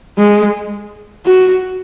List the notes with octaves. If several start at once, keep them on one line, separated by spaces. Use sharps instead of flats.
G#3
F#4